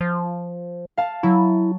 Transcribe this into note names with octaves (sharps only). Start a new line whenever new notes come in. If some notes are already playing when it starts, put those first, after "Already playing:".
F3
F5 A5
F#3 E4